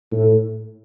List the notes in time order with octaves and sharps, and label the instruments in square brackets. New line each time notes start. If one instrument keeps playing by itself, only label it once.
[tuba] A2